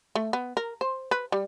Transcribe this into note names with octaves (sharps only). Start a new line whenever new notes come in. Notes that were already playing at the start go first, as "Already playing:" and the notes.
A3
B3
A#4
C5
B4
G3